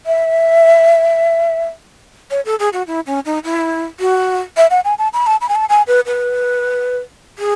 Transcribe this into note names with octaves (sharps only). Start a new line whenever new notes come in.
E5
C#5
A4
G#4
F#4
E4
C#4
D#4
E4
F#4
E5
F#5
G#5
A5
B5
A5
B5
G#5
A5
G#5
B4
B4
G#4